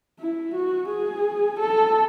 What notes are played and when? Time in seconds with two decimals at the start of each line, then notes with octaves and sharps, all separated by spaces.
0.19 E4
0.54 F#4
0.89 G#4
1.60 A4